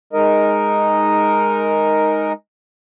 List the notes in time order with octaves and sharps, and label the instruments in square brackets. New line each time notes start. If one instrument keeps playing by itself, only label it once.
[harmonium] G#3 D#4 A#4 D#5